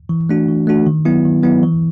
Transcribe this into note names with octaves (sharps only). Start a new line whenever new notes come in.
E3
A3 D4 F#4
E3
A3 D4 F#4
D#3
F#3 B3 E4
D#3
F#3 B3 E4
E3